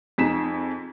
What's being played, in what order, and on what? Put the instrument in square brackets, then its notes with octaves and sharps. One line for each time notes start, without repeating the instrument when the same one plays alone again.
[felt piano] F2 D#4 G#4 B6 E7